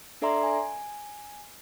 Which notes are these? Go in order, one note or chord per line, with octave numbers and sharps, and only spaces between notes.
D4 A4 D5 E5 A#5 C6
G#5